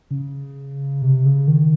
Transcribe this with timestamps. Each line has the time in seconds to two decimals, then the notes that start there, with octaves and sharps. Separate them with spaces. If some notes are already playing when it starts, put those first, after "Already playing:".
0.11 C#3
1.02 C3
1.26 C#3
1.48 D#3